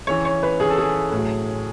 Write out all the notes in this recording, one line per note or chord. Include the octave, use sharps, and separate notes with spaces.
C#3 E3 C#5
C#5
B4
C#3 E3 G#4
A4
G#4
A2 F#3